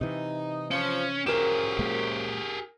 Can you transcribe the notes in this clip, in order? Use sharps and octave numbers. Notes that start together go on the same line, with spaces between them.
C3 E3 D#4
F3 C#4
F#2 F3 G4 G#4 A#4 E7
A#2 G#3 A#3